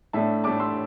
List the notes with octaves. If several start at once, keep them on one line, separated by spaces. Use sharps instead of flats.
A2 A3 D4 E5 A5
A2 A3 D4 A5 D6
C6 E6